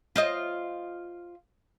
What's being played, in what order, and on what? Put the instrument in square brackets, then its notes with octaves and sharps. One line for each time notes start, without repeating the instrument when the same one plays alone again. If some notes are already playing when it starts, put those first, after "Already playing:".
[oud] F4 C5 D#5